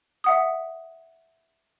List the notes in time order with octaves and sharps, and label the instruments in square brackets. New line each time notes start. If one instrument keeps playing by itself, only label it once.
[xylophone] E5 F#5 D#6